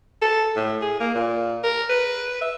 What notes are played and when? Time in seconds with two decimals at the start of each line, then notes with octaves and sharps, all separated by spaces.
0.22 A4
0.56 A2
0.81 G#4
1.00 A#3
1.15 A#2
1.63 A#4
1.89 B4
2.41 E5